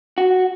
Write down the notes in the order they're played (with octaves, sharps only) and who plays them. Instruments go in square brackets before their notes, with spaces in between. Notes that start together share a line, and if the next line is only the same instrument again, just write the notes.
[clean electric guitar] F#4